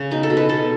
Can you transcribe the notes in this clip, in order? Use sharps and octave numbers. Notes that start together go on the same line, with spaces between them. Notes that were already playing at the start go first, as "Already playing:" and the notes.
Already playing: C#3
B2 D#4
A4
B2
B4
B2 A4